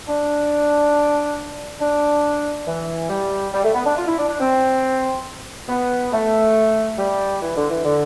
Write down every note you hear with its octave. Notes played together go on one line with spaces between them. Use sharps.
D4
D4
E3
G3
G3
A3
B3
D4
F4
E4
D4
D4
C4
B3
A3
G3
E3
D3
E3
D3